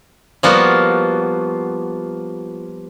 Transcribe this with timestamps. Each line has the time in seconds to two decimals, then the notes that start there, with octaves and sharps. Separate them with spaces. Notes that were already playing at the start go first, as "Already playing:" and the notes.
0.43 F3 G3 A#3 B3 F4 F#4